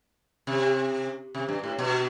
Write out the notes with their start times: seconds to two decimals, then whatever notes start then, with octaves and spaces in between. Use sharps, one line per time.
0.47 C3
1.35 C3
1.49 G2
1.64 A2
1.79 B2